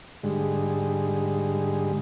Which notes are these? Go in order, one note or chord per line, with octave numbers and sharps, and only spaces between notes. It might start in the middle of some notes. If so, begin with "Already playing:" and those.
G#2 D3 G3 G#3